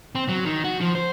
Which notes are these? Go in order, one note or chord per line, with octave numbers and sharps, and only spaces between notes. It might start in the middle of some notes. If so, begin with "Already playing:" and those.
C4
F#3
D#3
F#4
F3
C5